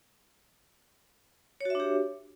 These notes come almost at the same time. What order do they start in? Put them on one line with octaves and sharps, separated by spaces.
C#5 F#4 E5 D4 G4